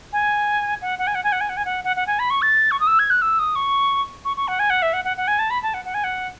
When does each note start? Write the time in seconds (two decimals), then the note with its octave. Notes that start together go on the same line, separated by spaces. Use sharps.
0.13 G#5
0.82 F#5
0.99 F#5
1.07 G#5
1.15 F#5
1.24 G#5
1.32 F#5
1.41 G#5
1.49 F#5
1.57 G#5
1.65 F#5
1.84 F#5
1.96 F#5
2.07 G#5
2.19 B5
2.30 C#6
2.42 A6
2.71 C#6
2.80 D#6
2.87 E6
2.99 G#6
3.10 F#6
3.22 E6
3.39 D#6
3.55 C#6
4.25 C#6
4.37 C#6
4.48 F#5
4.59 G#5
4.70 F#5
4.82 E5
4.93 F#5
5.04 F#5
5.17 F#5
5.27 G#5
5.39 A5
5.50 B5
5.62 A5
5.74 F#5
5.85 F#5
5.94 G#5
6.04 F#5